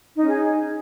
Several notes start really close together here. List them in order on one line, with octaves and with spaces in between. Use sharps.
D#4 C#4 G#4